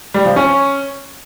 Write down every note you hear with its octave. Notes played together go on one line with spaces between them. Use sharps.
G3
F3
C#4